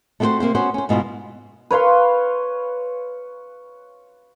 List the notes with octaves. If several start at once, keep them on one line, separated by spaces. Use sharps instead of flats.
A3 B3 C4 E4 F#4 C5
C3 A#3 C4 C5
B3 C#4 F#4 C5
C#4 C5
G#2 B2 E4 F4
B4 C#5 F5 C6